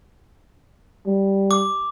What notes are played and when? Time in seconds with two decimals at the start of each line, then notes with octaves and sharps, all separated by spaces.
1.06 G3
1.51 D6